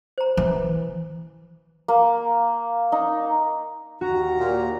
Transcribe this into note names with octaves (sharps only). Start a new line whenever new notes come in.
C5 A#5
E3
A#3
D#4
D#2 F#4 A#5
A#2